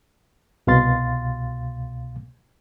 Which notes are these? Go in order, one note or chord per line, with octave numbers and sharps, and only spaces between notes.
C2 B2 F5 C6 A6